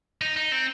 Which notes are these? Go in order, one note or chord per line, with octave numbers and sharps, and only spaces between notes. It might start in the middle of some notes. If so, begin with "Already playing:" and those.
D#4
D#4
C4